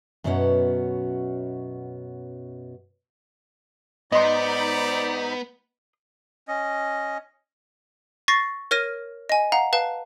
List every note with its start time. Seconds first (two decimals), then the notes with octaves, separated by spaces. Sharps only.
0.24 F#2 B2 F#3 B3 C#4 F#5
4.12 G#2 B3 D#4 D5 D#5 B5 C6
6.48 C#4 D#5
8.28 C#6 A6 A#6 C7
8.71 A#4 C#5 F6 A#6 D#7
9.29 D#5 G#5
9.52 F5 F#5 A#5
9.73 B4 F5 A5